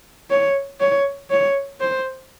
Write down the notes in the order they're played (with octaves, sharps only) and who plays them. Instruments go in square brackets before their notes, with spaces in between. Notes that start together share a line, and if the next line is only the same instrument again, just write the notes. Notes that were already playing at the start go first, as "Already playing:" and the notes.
[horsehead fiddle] C#5
C#5
C#5
C5